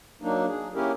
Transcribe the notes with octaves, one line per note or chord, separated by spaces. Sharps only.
F#3 A#3 D4 D#4
G#4
A#3 C#4 E4 G4 A#4